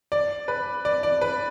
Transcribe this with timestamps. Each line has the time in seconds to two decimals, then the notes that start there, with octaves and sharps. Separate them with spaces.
0.12 D5
0.48 B4
0.85 D5
1.03 D5
1.21 B4